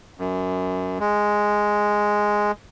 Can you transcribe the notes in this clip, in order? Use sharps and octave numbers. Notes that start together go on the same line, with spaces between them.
F#2
G#3